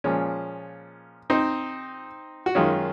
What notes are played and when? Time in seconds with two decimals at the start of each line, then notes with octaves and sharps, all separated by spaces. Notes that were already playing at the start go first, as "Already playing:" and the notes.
0.04 A#2 F3 G#3 C#4
1.30 C4 D#4
2.46 F#4
2.55 F#2 D#3 G#3 C#4 F4